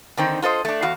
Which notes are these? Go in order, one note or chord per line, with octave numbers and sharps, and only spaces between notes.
D3 D#3 C4 D#4
F4 A4 C5 D#5
A3 D4
E2 F#4 F5